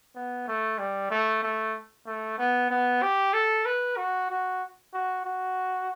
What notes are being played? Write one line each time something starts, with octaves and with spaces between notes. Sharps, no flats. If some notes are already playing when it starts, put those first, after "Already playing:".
B3
A3
G3
A3
A3
A3
B3
B3
G4
A4
B4
F#4
F#4
F#4
F#4